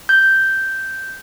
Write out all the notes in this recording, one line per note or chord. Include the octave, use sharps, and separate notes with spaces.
G6